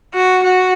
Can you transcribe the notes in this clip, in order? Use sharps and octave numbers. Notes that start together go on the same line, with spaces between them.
F#4
F#4